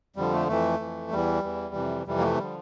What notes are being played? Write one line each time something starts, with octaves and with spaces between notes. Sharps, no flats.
F2 D3 F3 G3
A3
F2 E3 A3
F2 E3
E2 E3 G3
E2 E3
F2 C3 E3
F2 C3 E3 G3
A#3
A3
D3 F3 G3